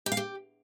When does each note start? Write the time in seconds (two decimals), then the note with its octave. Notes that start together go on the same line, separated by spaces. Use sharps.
0.06 G4
0.12 F5
0.17 G4